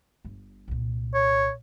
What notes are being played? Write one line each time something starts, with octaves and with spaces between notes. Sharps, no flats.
G1
C2 A#2
C#5